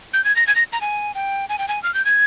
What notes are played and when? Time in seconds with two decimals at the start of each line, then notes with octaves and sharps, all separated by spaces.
0.14 G6
0.25 G#6
0.36 A#6
0.47 G#6
0.56 A#6
0.73 A#5
0.81 G#5
1.15 G5
1.49 G#5
1.59 G5
1.68 G#5
1.83 F6
1.94 G6
2.05 G#6